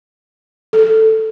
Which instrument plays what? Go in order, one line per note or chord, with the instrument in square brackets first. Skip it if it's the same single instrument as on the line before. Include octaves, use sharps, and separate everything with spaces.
[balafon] A4